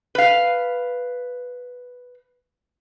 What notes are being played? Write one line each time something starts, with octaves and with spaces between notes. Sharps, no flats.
B4 F5